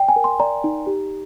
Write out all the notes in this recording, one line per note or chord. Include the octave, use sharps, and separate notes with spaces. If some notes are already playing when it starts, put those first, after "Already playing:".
Already playing: D5 G5
G#5
A#4
C6
D5 A#5
D#4
G4